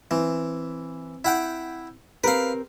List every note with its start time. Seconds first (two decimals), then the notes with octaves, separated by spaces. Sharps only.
0.11 E3 C4
1.25 E4 F#5 G5
2.24 C4 G4 A#4 B4 F5